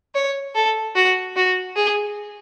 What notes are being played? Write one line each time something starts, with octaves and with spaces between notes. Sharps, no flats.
C#5
A4
F#4
F#4
G#4